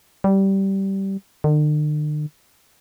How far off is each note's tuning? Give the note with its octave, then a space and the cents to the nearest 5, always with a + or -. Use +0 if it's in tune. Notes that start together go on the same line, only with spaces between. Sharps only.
G3 -15
D3 +45